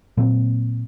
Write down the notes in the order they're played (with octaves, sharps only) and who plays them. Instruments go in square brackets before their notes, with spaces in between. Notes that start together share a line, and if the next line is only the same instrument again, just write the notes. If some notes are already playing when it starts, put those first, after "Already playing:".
[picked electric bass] A#2 F#3 A#3 C4